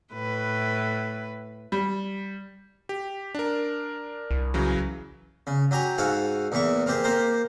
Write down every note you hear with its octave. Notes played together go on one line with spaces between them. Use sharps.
A2 B4
G3
G4
D4 A#4
C2
C#3 E3 F#3
C#3
F#3 G4 G#5 A#5
G#2 F#4 A4 F5 G#5
E2 A#2 E3 E5 C#6
A#3 C4 G4 G#4
A#3 G4 A#4 C5